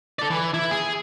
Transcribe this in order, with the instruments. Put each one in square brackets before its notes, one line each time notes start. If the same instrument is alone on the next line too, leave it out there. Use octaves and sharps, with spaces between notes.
[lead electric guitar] A4 D5
E3
E4
G#4